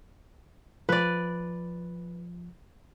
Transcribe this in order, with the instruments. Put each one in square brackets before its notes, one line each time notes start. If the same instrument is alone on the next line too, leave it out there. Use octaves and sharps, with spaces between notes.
[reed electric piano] F3 [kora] B4 D5